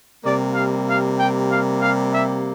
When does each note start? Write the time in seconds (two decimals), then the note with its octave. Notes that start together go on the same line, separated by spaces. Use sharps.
0.23 C3 G3 A#3 D5
0.54 F5
0.87 F5
1.19 G5
1.50 F5
1.82 F5
2.14 E5